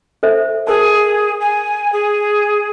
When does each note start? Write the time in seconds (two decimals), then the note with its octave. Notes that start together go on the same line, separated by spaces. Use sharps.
0.23 A4 C5 E5
0.67 G#4 A#4 A5
1.41 G#5
1.92 G#4